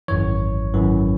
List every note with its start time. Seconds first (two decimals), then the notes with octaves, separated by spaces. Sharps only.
0.08 G#1 F#2 E3 C#5
0.74 G#1 F#2 E3